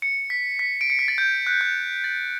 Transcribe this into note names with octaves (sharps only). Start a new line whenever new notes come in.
C#7
B6
B6
D7
C#7
B6
A6
G6
F#6
G6
A6